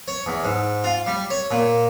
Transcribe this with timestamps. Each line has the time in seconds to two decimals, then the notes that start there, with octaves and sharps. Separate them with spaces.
0.08 C#5
0.26 E2
0.44 G#2
0.84 F4
1.06 G3
1.30 C#5
1.51 A#2